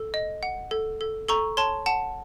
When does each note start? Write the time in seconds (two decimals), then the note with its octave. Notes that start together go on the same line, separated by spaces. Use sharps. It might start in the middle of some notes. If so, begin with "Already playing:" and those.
Already playing: A4
0.14 D#5
0.43 F#5
0.71 A4
1.01 A4
1.28 A4 A#5 C#6
1.57 C#5 A5 C6
1.86 F#5 A5